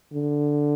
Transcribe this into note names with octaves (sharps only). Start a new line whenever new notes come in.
D3